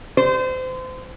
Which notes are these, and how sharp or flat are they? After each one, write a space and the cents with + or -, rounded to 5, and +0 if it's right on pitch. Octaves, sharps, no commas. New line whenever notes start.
C5 -30